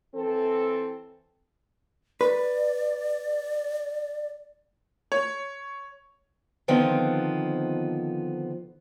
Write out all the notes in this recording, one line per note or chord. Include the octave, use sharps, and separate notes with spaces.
E3 C4 A4
B4 D5
C#5
D3 D#3 F3 B3 C4